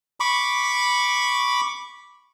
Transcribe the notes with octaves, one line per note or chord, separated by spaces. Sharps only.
B5 C#6 D6